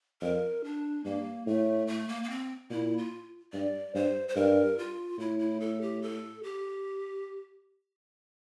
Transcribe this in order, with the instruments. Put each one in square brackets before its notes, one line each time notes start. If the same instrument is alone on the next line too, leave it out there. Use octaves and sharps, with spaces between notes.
[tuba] F2 [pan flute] A#4
[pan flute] D4
[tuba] G2 [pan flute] A#3
[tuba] A2 [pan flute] A3
[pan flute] A3
A#3
A#3
C4
[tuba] A#2 [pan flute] E4
[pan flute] F4
[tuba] G2 [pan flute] D5
[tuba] G2 [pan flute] C5
[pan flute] C5
[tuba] G2 [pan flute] A#4
[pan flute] F4
[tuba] A2 [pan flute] E4
[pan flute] E4
A4
G4
A4
G4